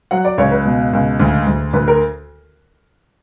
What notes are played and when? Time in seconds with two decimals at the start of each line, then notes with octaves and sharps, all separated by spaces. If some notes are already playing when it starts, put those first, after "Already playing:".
0.11 F#3 F#5
0.25 D5
0.38 C#2 C#5
0.51 B4
0.65 B2
0.93 C#2
1.20 D2
1.47 D2
1.73 D2 B4
1.88 A#4